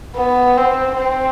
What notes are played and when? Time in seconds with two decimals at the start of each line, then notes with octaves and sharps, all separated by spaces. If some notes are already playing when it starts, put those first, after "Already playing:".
0.16 B3
0.57 C4
0.98 C4